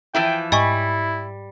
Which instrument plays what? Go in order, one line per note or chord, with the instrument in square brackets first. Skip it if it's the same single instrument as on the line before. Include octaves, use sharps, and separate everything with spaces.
[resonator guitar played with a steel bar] E3 F3 E4 [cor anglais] G5
[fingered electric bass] G#2 G#3 [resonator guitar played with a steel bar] G3 [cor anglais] E4 [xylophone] D#5 G#5 C#6